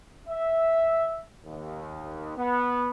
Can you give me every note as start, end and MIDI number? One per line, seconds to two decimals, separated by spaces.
0.28 1.19 76
1.46 2.35 39
2.37 2.91 59